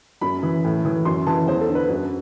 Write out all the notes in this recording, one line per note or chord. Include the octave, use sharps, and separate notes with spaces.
F#2 B5
E3
A2
E3
F#2 C6
E3 A5
E2 C5
A4
D3
B4
F#2